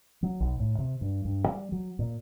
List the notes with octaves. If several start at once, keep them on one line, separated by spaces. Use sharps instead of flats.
F#3
B1
A2
C3
G2
G2
G3
F#3
A#2